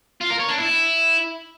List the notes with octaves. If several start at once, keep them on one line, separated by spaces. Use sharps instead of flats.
F4
A#4
C#5
D4
E4